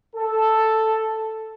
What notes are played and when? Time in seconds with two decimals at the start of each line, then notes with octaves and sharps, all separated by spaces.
0.15 A4